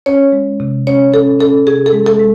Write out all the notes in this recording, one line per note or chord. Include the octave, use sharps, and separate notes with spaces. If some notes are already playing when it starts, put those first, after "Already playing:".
C#4 C#5
G#3
C3
C#4 C#5
C#4 A4
C#4 A4
C3 G#4
A4
G#3
A4
G#3